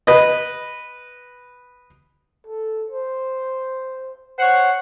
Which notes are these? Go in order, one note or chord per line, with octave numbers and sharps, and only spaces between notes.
B4 D#5
A4
C5
C5 C#5 F#5